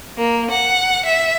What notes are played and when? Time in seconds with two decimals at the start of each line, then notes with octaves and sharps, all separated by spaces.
0.17 A#3
0.50 F#5
1.05 E5